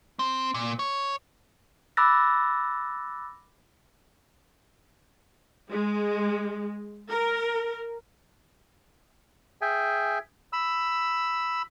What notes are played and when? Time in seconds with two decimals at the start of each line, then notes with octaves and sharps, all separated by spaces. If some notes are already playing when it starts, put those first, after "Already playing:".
0.19 C4
0.54 A#2
0.79 C#5
1.97 B5 D6 E6 F#6 A6 A#6
5.70 G#3
7.09 A#4
9.61 G#4 E5 G5 G#5
10.53 B5 E6